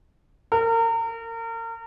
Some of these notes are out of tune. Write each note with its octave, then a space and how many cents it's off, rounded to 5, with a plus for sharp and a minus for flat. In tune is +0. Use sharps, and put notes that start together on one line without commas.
A#4 -35